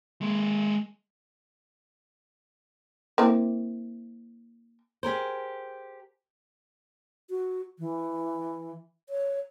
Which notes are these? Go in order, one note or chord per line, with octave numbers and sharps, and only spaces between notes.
G#3 A#3
A#3 C4 E4
G4 G#4 A#4 C5
F#4
E3
C#5